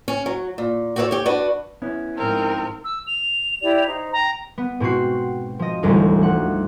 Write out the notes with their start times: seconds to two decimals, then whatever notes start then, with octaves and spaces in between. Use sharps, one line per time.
0.08 C#4
0.26 F#3
0.58 A#2
0.96 F#4 G4 A4 B4 C#5 D5
1.11 G4 C#5
1.26 D4 F#4 B4
1.82 B3 C#4 E4
2.18 G#2 F3 C4 A#4
2.84 E6
3.07 F7
3.62 E4 G4 D5
3.85 D#4 C5
4.13 G5 A#5
4.58 B3
4.80 G#2 B2 C4 F#4 C7
5.59 F3 D#5
5.83 E1 D2 G#2 G3 G#3 D#4
6.21 F3 F#5